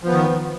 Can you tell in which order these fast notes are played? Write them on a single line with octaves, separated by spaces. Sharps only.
F3 B3 D#3